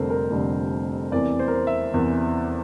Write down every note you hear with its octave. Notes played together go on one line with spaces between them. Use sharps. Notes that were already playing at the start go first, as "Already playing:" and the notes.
Already playing: F1 F2 D3 G3 A#3 A4 A#4 C5
A#4
F1 F2 D3 G3 A#3
E2 C3 E3 A#3 D5
C5
A#4
C5
E5
E2 C3 E3 A#3